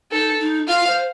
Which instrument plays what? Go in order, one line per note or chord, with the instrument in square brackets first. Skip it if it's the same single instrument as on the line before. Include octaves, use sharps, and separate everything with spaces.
[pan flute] D#4 [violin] A4
[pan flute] D#4
[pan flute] F4 [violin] F5
[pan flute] C5